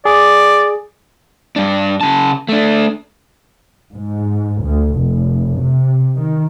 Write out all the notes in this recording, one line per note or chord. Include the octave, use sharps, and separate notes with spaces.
G#4 D5
G2 D4
C#3 A5
A3 D4
G#2
D2
F1
C3
D#3